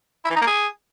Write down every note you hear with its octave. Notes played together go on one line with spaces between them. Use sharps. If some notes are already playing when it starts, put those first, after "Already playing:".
E4
E3
D#4
A#3
G#4